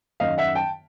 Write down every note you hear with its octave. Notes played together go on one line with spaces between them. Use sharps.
F#2 D#3 D#5 F5
E5 F#5
G5 A5